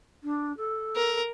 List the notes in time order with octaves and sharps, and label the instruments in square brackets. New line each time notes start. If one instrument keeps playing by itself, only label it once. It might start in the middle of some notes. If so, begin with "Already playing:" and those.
[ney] D4
A4
[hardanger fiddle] A#4